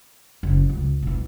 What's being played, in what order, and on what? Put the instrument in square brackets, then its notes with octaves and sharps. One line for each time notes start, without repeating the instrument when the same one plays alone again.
[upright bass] F#1
C#2
E2 B2